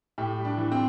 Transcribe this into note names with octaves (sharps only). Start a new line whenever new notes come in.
A2 G4
G3
D4
E3
C4